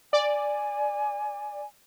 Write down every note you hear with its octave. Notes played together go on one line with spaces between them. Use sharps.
D5 G#5